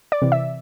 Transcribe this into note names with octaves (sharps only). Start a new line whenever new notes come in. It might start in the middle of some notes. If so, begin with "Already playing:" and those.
D5
C3 E3
E5